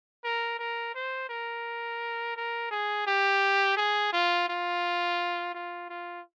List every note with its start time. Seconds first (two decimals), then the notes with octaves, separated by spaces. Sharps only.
0.24 A#4
0.59 A#4
0.95 C5
1.29 A#4
2.37 A#4
2.71 G#4
3.07 G4
3.77 G#4
4.13 F4
4.49 F4
5.54 F4
5.89 F4